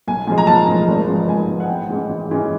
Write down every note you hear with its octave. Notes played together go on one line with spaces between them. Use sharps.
B1 G#5
A2 F3 G#3 G#5
A#5
B1 A5
A2 F3 G#3
G#1
G#2 F3 G#3 B3
G#1 G#5
G#2 F3 G#3 B3
F#5
A1 G5
G#2 E3 G#3 C#4
A1
G#2 E3 G#3 C#4